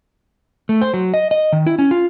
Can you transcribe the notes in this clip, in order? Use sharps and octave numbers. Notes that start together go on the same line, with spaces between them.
A3
C5
F#3
D#5
D#5
D#3
E4
C#4
F4